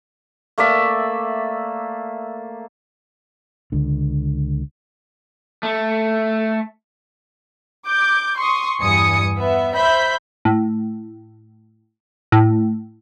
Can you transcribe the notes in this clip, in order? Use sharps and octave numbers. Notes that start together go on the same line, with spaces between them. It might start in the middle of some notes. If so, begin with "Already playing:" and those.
A3 A#3 D5 E5
C#2 D3
A3
D6 G6
C6 C#6 D#6
E2 G2 E3 G#5 D#6 C#7
B3 E5
C5 E5 B5 G6 B6
A2
A2